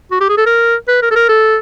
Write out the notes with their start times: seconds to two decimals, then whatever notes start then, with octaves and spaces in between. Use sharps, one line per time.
0.11 F#4
0.20 G4
0.29 G#4
0.37 A4
0.46 A#4
0.88 B4
1.02 A#4
1.11 A4
1.15 A#4
1.29 A4